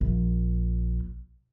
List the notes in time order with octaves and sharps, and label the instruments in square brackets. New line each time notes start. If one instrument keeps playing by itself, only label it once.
[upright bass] A#1